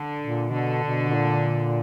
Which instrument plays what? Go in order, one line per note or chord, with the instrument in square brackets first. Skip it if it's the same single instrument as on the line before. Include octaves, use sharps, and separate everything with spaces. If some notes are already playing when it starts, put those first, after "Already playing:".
Already playing: [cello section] D3
[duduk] A#2
[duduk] B2 [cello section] D3
[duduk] B2
B2
A#2